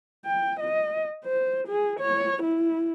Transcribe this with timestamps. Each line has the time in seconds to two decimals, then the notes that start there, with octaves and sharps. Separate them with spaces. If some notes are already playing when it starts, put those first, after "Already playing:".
0.25 G5
0.59 D#5
1.24 C5
1.67 G#4
1.99 C#5
2.42 E4